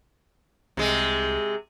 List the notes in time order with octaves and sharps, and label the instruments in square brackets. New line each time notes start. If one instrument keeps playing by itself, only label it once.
[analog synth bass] C2 [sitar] C3 G#3